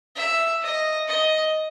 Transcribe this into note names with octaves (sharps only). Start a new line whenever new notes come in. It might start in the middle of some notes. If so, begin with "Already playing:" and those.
E5
D#5
D#5